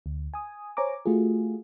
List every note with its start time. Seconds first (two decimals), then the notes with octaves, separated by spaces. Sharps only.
0.06 D2
0.34 G#5 D#6
0.77 C5 C#5 G#5 A#5 D6
1.06 A3 F4 F#4 G#4